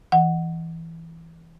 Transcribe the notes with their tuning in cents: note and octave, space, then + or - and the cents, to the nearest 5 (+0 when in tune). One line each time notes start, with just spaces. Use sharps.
E3 +0 F#5 +0